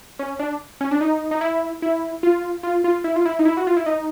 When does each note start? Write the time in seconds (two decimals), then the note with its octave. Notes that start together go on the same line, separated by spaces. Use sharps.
0.19 C#4
0.39 D4
0.81 C#4
0.91 D4
1.01 D#4
1.31 D#4
1.41 E4
1.82 E4
2.23 F4
2.63 F4
2.84 F4
3.04 E4
3.16 F4
3.25 E4
3.39 D#4
3.45 E4
3.57 F#4
3.67 F4
3.77 E4
3.86 D#4